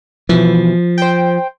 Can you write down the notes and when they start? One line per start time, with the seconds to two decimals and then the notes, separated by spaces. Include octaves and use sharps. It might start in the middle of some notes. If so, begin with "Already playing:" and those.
0.29 B2 E3 F3
0.98 C5 G5